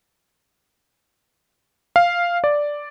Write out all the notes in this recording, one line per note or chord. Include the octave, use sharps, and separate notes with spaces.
F5
D5